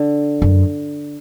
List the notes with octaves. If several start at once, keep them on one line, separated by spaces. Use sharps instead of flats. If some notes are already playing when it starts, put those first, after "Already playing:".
Already playing: D3
F#2